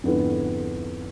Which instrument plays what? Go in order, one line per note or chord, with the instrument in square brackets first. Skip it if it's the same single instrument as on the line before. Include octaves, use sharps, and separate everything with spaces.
[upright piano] F2 G#2 D3 B3 E4